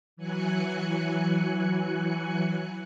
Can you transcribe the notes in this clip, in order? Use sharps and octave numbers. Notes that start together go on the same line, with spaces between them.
E3 F#3 G#5 F#6 C#7